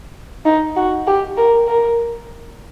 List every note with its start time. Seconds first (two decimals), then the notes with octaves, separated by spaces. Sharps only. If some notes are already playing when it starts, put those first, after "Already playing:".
0.45 D#4
0.76 F#4
1.07 G4
1.37 A#4
1.67 A#4